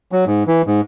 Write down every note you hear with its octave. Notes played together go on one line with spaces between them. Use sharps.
F#3
G#2
E3
G#2